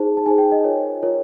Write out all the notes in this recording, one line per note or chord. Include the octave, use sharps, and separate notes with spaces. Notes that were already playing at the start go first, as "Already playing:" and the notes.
Already playing: D#4 G#4 C5 A5
A5
D#4 G#4 C5 G#5
G5
D#5
F4 A#4 C#5
F4 A#4 C#5